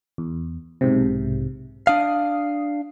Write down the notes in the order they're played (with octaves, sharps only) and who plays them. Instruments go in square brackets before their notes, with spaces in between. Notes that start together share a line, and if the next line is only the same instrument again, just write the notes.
[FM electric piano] E2
B1 G#2 C3
[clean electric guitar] D4 F5 [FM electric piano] D#6